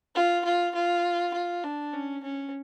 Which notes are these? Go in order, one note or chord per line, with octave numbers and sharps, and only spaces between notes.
F4
F4
F4
F4
D4
C#4
C#4